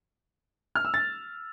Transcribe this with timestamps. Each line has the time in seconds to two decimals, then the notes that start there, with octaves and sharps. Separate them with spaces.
0.75 F6
0.85 E6
0.94 A6